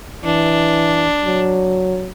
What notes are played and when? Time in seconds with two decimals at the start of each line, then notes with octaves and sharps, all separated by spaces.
0.25 E3 D4
1.26 F#3